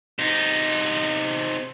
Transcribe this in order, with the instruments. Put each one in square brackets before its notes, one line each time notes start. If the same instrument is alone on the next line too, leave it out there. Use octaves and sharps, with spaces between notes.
[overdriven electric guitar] C3 D#4